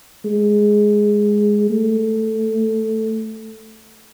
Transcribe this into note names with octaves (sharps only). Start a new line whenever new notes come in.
G#3
A3